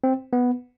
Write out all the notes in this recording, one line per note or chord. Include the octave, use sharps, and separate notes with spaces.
C4
B3